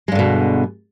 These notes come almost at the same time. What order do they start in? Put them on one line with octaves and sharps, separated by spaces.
G#3 G2 D3 B2